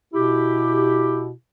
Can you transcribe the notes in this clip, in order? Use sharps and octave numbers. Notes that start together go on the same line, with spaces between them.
B2 E4 G4